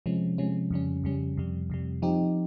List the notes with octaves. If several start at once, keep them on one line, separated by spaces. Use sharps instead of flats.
C3 F3 G#3 C#4
C3 F3 G#3 C#4
F2 C#3 G3 C#4
F2 C#3 G3 C#4
F2 C3 G3
F2 C3 G3
F3 C4 D#4 G4